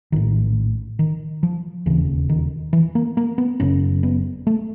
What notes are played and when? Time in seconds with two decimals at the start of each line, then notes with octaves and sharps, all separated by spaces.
0.12 A#1 A2 D#3
0.99 D#3
1.43 F3
1.86 E1 D#2 C#3 E3
2.29 D#3
2.73 E3
2.95 A#3
3.17 A#3
3.38 B3
3.60 F#1 F#2 C#3 C#4
4.03 B3
4.47 A3